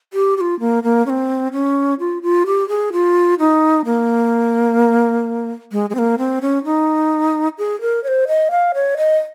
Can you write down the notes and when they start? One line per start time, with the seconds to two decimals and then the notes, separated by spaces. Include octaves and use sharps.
0.13 G4
0.37 G4
0.41 F4
0.60 A#3
0.83 A#3
1.06 C#4
1.10 C4
1.53 C#4
2.00 F4
2.23 F4
2.46 G4
2.69 G#4
2.93 F4
3.39 D#4
3.85 A#3
5.72 G#3
5.90 G#3
5.95 C4
5.99 A#3
6.18 C4
6.42 C#4
6.65 D#4
7.58 G#4
7.81 A#4
8.04 C#5
8.08 C5
8.28 D#5
8.51 F5
8.74 C#5
8.97 D#5